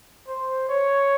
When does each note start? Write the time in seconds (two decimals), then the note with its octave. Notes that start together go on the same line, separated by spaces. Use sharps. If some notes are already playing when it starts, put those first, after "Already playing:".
0.27 C5
0.69 C#5